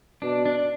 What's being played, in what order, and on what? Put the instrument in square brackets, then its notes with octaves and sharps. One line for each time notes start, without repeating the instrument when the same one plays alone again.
[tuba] B2 [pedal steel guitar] D4
[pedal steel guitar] D4